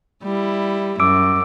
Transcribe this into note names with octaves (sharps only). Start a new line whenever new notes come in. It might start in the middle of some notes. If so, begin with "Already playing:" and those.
G3 E4
F#2 D6 E6 D7